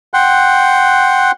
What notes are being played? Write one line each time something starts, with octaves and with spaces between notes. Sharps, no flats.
F#5 G5 C6 F#6